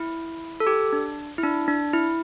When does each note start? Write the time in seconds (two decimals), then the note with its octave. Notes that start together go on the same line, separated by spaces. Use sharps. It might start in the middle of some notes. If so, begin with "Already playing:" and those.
Already playing: E4
0.60 A4
0.67 G4
0.93 D4
1.38 E4
1.43 D4
1.68 D4
1.93 E4